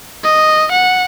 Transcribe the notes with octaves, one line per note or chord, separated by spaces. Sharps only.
D#5
F#5